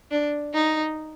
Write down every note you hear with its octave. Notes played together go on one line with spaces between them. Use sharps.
D4
D#4